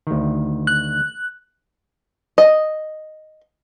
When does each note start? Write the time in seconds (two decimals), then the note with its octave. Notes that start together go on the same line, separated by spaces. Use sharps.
0.07 D2 D#3
0.67 F#6
2.38 D#5